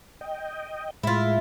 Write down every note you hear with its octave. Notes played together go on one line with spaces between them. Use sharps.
D#5 G5
A2 G#3 E4 F4